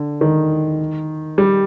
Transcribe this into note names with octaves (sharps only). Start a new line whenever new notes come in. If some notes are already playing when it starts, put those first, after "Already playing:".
Already playing: D3
D#3
G3